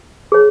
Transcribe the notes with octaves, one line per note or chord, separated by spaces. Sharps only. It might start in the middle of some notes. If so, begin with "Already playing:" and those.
G#4 C#5